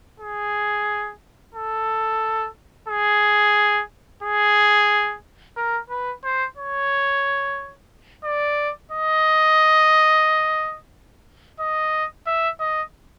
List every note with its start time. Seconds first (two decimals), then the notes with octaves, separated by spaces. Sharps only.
0.20 G#4
1.55 A4
2.88 G#4
4.23 G#4
5.56 A#4
5.90 B4
6.24 C5
6.57 C#5
8.24 D5
8.91 D#5
11.60 D#5
12.27 E5
12.60 D#5